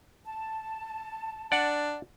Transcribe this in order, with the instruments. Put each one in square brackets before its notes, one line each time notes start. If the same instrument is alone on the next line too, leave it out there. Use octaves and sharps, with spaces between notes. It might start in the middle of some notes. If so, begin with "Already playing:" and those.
[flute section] A5
[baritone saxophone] D4 [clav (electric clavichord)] D5 F#5